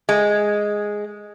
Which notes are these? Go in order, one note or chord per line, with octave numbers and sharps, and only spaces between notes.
G#3